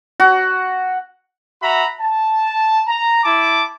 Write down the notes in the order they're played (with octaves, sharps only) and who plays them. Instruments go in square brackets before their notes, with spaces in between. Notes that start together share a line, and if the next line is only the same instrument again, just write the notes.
[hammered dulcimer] F#4
[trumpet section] F#4 E5 A#5 B5
A5
A#5
E4 A5 D6